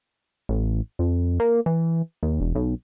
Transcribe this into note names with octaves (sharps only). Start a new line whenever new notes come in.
A1
F2
A#3
E3
D#2
E1
B1